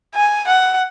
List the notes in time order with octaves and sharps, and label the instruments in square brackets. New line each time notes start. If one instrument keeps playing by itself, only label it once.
[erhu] G#5
F#5